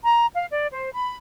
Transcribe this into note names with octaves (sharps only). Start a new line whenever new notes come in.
A#5
F5
D5
C5
B5